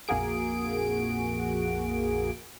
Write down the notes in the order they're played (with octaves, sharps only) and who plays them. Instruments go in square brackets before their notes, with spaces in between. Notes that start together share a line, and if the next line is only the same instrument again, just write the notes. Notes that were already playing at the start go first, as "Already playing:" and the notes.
[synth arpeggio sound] A#1 F2 A#3 F#4 G#4 D7